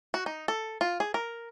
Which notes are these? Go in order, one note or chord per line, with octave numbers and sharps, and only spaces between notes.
F#4
D#4
A4
F4
G#4
A#4